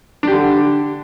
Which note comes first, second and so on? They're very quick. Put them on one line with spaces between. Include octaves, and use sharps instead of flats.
D4 G4 D3